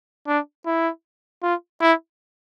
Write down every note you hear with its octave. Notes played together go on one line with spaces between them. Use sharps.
D4
E4
F4
E4